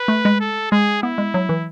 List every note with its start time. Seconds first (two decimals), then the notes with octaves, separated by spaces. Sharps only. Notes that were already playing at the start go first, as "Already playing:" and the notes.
Already playing: B4
0.08 A3
0.25 G#3
0.40 A4
0.71 G#3 G#4
1.02 B3 E4
1.18 G#3
1.34 F#3
1.49 E3